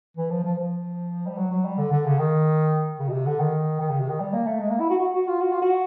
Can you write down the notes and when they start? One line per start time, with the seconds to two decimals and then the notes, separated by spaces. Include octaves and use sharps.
0.17 E3
0.30 F3
0.44 F3
0.58 F3
1.27 G3
1.37 F#3
1.51 F#3
1.65 G3
1.78 D3
1.92 D3
2.05 C#3
2.18 D#3
2.99 C#3
3.09 B2
3.13 C3
3.26 D3
3.39 D#3
3.80 D#3
3.90 C#3
4.00 C3
4.09 D#3
4.20 G3
4.33 A#3
4.47 A3
4.60 G#3
4.70 A#3
4.80 E4
4.90 F#4
5.00 F#4
5.14 F#4
5.28 F4
5.41 F#4
5.52 F4
5.62 F#4